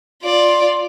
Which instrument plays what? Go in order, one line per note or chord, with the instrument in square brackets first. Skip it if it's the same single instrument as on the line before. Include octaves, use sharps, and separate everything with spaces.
[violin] F4 D5